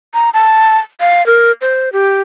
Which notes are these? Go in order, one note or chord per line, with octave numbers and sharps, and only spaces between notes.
A#5
A5
F5
A#4
C5
G4